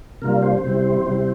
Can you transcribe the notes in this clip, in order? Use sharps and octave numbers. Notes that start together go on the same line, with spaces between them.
C3 G3 A#3 D4 F4 A#4
C5
C3 G3 C4 E4
C3 G3 C4 E4